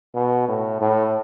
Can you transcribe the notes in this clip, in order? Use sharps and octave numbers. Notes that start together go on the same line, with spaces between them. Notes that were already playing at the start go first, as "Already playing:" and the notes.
B2
A2
A2